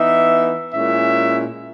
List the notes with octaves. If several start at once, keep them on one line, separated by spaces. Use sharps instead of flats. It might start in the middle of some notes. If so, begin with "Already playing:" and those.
Already playing: E3 B3 D#4 E5
A#2 G#3 C#4 E4 E5